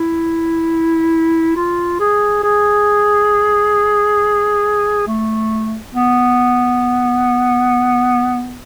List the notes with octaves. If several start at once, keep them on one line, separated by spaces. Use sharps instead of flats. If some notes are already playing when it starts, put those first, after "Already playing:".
Already playing: E4
F4
G#4
G#4
A3
B3